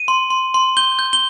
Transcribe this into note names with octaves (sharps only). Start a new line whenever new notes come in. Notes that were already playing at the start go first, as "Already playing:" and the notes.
Already playing: D#7
C6
C6
C6
G6 G7
G6
G7